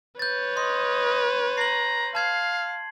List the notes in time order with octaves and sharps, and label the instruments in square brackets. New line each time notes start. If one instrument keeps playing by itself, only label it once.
[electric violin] B4 C#5 [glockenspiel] G6 A6
[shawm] D#5 [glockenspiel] C6
[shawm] A#5 [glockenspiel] C7 F#7
[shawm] F5 [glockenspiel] A5 G#6 C7